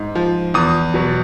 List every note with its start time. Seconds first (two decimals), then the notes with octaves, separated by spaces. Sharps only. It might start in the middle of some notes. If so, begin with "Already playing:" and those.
Already playing: G#2
0.15 F3
0.54 E2 D#6
0.94 B2 F#3